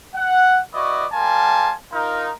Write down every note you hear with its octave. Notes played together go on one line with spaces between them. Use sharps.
F#5
E4 F#4 B4 D5 D#5 C#6
G3 A#4 F5 G#5 A5 C6
D#4 F4 A#4